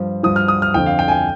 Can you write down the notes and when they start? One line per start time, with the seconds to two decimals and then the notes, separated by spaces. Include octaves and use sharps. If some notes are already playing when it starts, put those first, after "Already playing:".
Already playing: G2 F3
0.23 G2 F3 D#6
0.36 F6
0.48 D#6
0.62 F6
0.74 F2 D3 F3 G5
0.86 F5
0.99 G5
1.08 G#5
1.12 G5